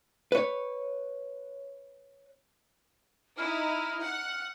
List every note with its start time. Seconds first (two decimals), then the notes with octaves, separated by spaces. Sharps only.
0.32 B4 C#5
3.38 D#4 E4 F6
4.03 F#5